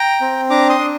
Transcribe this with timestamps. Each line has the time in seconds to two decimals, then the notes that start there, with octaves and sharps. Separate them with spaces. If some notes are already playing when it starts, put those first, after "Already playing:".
Already playing: G5 A#5
0.21 C4
0.50 D4 A#5 D6
0.69 C6 D#6
0.79 D4